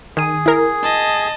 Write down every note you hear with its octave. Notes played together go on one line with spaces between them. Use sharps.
D#3 G#4 D#7
E4 A#4
D#5 A5